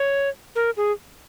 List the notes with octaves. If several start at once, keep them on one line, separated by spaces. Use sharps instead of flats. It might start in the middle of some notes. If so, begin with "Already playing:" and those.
Already playing: C#5
A#4
G#4